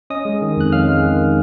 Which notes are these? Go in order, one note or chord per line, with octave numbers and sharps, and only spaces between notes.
C#4 D#5 D#6
G#3
D#3
F2 F#6
C#4 F5 F6
G#3
D#3